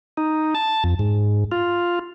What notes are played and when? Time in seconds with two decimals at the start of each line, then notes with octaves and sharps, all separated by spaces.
0.17 D#4
0.55 A5
0.84 F2
0.99 G#2
1.52 F4